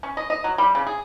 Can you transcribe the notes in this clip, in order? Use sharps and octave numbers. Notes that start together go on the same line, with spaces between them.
C#4
D#5
D#5
F#3
G3
C#3
G#4